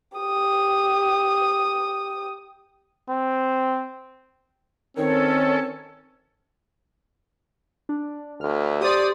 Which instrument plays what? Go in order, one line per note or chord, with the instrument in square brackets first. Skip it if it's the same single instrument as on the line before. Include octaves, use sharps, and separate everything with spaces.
[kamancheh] G4 D#6
[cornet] C4
[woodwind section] D#3 [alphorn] C4 [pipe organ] C#4 A4 [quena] C#5
[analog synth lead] D4
[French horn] D2 [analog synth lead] F6
[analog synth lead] G4 [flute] C5 [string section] D5 D#6